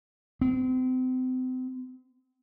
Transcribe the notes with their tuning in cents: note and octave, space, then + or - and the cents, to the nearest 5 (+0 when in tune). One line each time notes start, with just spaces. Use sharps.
C4 -35